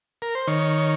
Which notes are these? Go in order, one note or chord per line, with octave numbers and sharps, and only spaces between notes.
A#4
C5
D#3 C#5